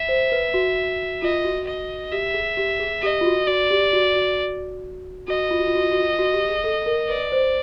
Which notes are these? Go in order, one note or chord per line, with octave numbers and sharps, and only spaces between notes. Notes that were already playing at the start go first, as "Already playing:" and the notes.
Already playing: E5
C5
B4
F#4
F4 D#5
F#4
D#5
G4 E5
G#4
G4
G#4
G4 D#5
F4
F#4
F#4 D5
G4
F#4
F#4
F#4 D#5
F4
F#4
F4
F#4
F4
F#4
F4
F#4
G4
G#4
A4
A#4
B4 D5
C5